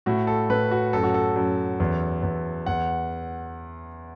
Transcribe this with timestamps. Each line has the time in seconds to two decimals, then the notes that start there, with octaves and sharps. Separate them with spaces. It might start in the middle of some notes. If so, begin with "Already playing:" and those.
0.06 A2 F#4
0.27 A4
0.50 A2 B4
0.71 F#4
0.93 F#2 A4
1.03 F#4
1.14 A4
1.36 F#2
1.80 E2
2.23 E2
2.66 E2 F#5